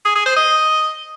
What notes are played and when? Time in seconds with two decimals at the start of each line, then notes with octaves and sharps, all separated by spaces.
0.05 G#4
0.15 G#4
0.26 C5
0.36 D#5